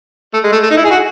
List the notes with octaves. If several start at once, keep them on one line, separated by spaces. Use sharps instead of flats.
A3
G#3
A3
A3
D#4
E4
G#4
F#4